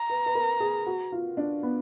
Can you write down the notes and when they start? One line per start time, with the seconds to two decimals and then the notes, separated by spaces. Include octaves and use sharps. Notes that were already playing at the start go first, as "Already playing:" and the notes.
Already playing: A#5
0.10 B4
0.26 B4
0.35 A#4
0.60 G#4
0.86 F#4
1.12 F4
1.37 D4
1.63 B3